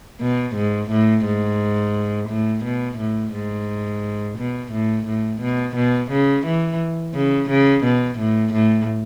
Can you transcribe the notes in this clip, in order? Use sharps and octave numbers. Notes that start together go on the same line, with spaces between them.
B2
G#2
A2
G#2
A2
B2
A2
G#2
B2
A2
A2
B2
B2
C#3
E3
C#3
C#3
B2
A2
A2